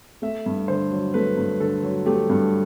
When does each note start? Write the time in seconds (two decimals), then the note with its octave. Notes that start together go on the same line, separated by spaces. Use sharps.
0.22 A3 E5
0.46 G2
0.68 D3 C5
0.91 F#3
1.14 A3 B4
1.37 G2
1.60 D3 A4
1.83 F#3
2.06 A3 G4
2.30 G2